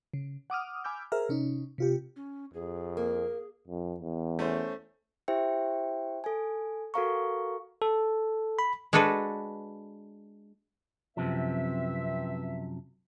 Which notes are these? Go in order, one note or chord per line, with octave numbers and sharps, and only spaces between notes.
C#3
F#5 D6 D#6 F6
G#5 B5 D6 E6 F6 G6
G#4 A#4 C5 E5 A#5 F6
C3 C#4 D#4
C3 F4 G4
C#4
F2 G#4
A#3 A#4
F2
E2
A3 C#4 C5
E4 G4 C5 E5 G5
A4 G#5
F#4 A4 A#4 F5 A#5 C#6
A4
B5
G#3 D4 F#4 A4 B4
F#2 C3 F3 C4 B4 E5